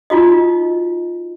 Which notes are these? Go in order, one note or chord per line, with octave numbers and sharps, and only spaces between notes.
D#4 F4 F#4 D#5